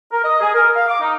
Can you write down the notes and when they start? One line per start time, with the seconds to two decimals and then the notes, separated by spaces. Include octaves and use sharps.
0.12 A#4
0.24 D#5
0.41 G#4
0.55 A#4
0.75 F5
0.88 D6
1.01 D#4